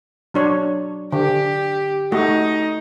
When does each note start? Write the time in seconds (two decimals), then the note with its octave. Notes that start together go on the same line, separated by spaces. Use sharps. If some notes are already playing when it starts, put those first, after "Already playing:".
0.34 F#3 D4 C#5
1.12 D3 G4
2.12 A3 D#4 F#4